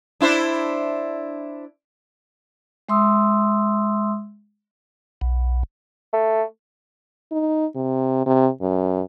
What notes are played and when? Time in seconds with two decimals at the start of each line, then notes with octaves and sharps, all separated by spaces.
0.21 D4 E4 C5
2.89 G#3 E5 C6 D#6 E6
5.21 B1
6.13 A3
7.31 D#4
7.75 C3
8.26 C3
8.61 F#2